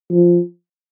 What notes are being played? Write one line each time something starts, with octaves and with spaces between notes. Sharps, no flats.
F3